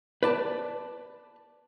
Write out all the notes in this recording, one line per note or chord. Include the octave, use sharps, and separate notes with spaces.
B4 D5 A5